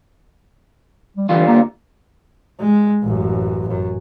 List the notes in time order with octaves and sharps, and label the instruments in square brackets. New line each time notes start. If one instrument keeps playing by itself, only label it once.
[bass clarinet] G3
[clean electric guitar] D3 G3 F4 [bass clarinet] E3
[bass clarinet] A#3
[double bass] G#3
A1 F#2
F#2